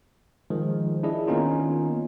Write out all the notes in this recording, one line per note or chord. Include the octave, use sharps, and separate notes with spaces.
D#3 F3 G#3
D4 E4 G#4 D#5
D#3 A#3 B3 C#4 D#4 F4